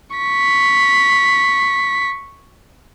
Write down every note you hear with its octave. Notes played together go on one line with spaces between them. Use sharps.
C#6 B6